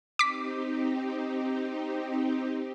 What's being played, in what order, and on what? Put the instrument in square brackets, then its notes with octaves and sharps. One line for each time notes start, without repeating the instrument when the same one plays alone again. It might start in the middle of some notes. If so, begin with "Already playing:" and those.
[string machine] C4 D#4 G4 [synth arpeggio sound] D6 B6